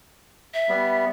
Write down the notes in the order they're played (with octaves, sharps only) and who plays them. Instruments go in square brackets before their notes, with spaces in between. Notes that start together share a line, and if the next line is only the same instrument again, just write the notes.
[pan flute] E5
[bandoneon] G3 B3